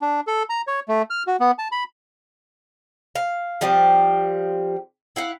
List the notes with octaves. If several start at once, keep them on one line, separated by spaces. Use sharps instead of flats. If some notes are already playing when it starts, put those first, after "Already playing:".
D4
A4
A#5
C#5
A3
F6
F#4
B3
A5
B5
F5
F3 G3 C4 G4
E4 F5 F#5